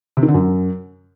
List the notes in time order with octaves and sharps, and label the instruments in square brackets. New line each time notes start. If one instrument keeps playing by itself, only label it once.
[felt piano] C3
D#3
D3
F#2